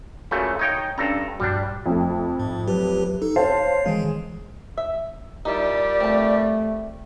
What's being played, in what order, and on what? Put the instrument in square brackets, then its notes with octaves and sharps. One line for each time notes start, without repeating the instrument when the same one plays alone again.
[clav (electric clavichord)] A#2 C#3 A3 [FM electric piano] F#4 B5
[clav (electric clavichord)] D#4 C#5 G5 [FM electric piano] D#6 G6
[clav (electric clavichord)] G2 A4 A#5 [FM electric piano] C#4 D4
[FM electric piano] A#1 G2 F#4 [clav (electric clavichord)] G3 D4
[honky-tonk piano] F2 A3
[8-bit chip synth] G#2
F#3 G4 B4
D#4 A4
[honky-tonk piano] C5 F5 A5 [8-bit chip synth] C#5 C7
[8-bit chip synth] D#3 E3 [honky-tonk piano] G#3
[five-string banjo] E5
[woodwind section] A#2 G3 G4 [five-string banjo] D#4 E4 [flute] D5
[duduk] A3 [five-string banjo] C4 A5